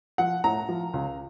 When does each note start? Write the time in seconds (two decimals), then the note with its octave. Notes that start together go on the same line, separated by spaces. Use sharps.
0.18 F3 F#5
0.44 A2 A#5
0.69 F3
0.94 C#2